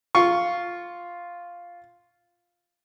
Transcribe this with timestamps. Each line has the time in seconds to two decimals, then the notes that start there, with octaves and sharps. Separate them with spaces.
0.15 F4 C#6